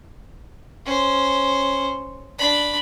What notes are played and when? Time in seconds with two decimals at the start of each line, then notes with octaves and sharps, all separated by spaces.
0.86 C#4 C5
2.39 D4 B5